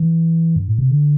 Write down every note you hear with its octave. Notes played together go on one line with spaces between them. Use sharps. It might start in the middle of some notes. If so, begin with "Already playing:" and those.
Already playing: E3
G2
A2
C3
D3